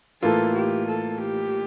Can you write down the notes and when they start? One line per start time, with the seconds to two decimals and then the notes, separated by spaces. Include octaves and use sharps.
0.22 A2 E3 A#3 F4 A4
0.56 G4
0.88 A4
1.21 G4